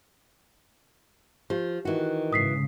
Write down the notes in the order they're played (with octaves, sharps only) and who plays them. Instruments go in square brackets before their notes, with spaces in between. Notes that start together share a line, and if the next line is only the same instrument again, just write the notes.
[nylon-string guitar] F3 [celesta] G4
[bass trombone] D#3 [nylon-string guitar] E3 F#4
[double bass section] G#2 C#3 [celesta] D#6 B6 C7